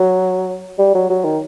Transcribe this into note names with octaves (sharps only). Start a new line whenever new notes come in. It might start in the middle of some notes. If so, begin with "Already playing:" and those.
Already playing: F#3
G3
F#3
F#3
D#3